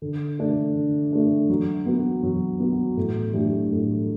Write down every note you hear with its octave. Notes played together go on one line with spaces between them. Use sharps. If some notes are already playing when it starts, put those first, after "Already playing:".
D3
A3 D4
D3
A3 D4
F#3
B3 F#4
F#3
B3 F#4
A2
F#3 A3 D4 G4
A2